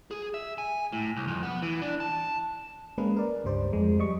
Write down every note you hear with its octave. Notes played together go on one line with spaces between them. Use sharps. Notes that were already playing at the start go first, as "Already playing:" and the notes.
G#4
E5
G#5
A2
C2
F2
B3
E3
D4
A5
G#3 A#3 C#4 G#4 A#4 B4
A#4 D5
C#2 G2 G3 C5 D5
F2 G#3
G3 D#5 C#6